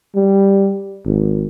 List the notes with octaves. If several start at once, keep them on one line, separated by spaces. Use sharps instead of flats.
G3
G#1